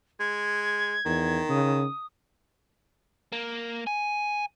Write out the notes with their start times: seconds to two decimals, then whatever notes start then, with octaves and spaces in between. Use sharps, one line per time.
0.20 G#3 G#6
1.05 E2 D#3
1.49 C#3 D#6
3.32 A#3
3.87 G#5